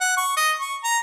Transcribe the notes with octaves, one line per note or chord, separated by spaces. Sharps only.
F#5
C#6
D#5
C#6
A#5